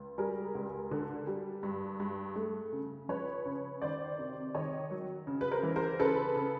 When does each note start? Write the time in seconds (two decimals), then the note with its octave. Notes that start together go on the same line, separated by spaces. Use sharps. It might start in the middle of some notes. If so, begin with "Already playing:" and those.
Already playing: C#2
0.18 G3 G#4 A#4
0.55 C#2
0.91 D3
1.27 G3
1.63 G2
2.00 G2
2.36 A3
2.73 C#3
3.09 F3 B4 C#5
3.45 C#3
3.82 D#3 C5 D5
4.19 C3
4.55 D#3 C#5 D#5
4.91 F#3
5.27 C#3
5.41 B4
5.51 A#4 C5
5.63 E3
5.76 A#4 C5
6.00 C#3 A4 B4
6.36 C#3